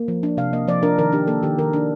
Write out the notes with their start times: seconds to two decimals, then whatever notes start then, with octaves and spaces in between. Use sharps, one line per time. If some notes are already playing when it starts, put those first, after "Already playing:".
Already playing: A#3
0.08 F3
0.23 D4
0.37 C3 F5
0.53 A#3 D#5
0.68 F3 D5
0.83 D4 A#4
0.98 D#3 A#4
1.12 D4 G4
1.27 A#3 A4
1.43 D#3 G4
1.59 D#3 A#4
1.73 D4